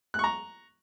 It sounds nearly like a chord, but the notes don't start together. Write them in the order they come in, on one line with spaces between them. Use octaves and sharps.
F#6 C#6 A#5